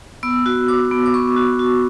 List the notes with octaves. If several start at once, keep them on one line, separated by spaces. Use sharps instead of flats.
B3 E6
F#4
F#4 D6
B3
D6
B3 C#6
F#4
F#4